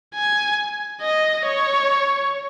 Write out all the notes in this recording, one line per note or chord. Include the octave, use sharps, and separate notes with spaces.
G#5
D#5
C#5